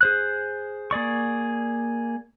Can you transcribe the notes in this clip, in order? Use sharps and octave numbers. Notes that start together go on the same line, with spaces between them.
G#4 C5 F#6
A#3 G#4 D5 C#6